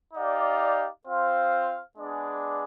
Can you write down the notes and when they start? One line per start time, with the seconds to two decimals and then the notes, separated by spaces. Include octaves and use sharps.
0.14 D#4 G4 D5 F5
1.07 C4 F4 C5 F5
1.98 G#3 B3 D4 G#4 D5